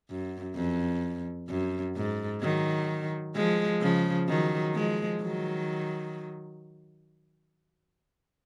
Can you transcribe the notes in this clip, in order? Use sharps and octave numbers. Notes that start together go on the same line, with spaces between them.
F#2
F2
F#2
G#2
D#3 F#3
F3 G#3
C#3 F3
D#3 F#3
F3 G#3
D#3 F#3